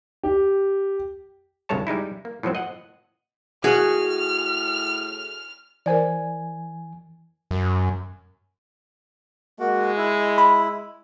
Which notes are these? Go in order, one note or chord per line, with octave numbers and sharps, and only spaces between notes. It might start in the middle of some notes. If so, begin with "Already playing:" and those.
G4
G1 C2 G2 G#3 C#5 A5
G3 G#3 D#4 E4
A#3
A2 F3 F#3 C4
D#5 F#5
A2 F#4 G#4 F#5 F6
E3 A#4 C5 D5 G#5
F#2
G#3 A#3 F#4
E4
B5